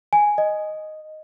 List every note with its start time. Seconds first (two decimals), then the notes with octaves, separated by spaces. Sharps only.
0.13 G#5
0.38 D#5